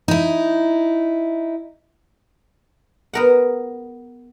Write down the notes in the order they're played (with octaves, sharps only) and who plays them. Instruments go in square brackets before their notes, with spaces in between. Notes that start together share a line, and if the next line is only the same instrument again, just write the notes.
[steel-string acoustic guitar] D#4 E4
[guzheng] B3 A#4 F#5